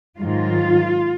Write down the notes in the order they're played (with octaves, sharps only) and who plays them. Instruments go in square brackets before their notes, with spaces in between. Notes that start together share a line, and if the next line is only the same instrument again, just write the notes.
[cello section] G#2 D#3 F#3 F4